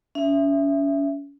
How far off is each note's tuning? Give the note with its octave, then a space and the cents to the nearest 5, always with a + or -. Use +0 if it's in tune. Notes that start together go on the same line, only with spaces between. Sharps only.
C#4 +35 E5 +10